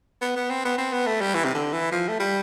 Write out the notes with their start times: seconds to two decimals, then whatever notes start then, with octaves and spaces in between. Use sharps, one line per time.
0.21 B3
0.36 B3
0.50 C4
0.65 B3
0.78 C4
0.92 B3
1.07 A3
1.21 G3
1.34 E3
1.45 C3
1.54 D3
1.72 E3
1.92 F3
2.08 A3
2.20 G3